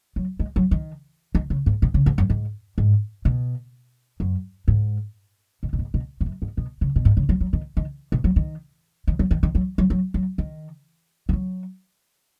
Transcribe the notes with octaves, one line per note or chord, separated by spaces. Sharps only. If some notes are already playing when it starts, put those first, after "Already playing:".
F#3
G#3
F#3
D#3
D#3
C#3
G#2
B2
C#3
G#2
F#2
G#2
G#2
B2
F#2
G#2
B2
B2
G#2
B2
G#2
F#2
G#2
B2
C#3
B2
G#2
C#3
F#3
F#3
D#3
D#3
B2
F#3
D#3
D#3
F#3
D#3
D#3
F#3
F#3
F#3
F#3
D#3
D#3
F#3